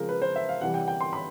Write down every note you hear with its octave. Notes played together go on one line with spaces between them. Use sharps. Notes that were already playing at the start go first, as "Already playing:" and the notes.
Already playing: C#3 F3 G#3 C4 A#4
B4
C5
E5
F5
C3 E3 G3 F#5
G5
G5
C6
B5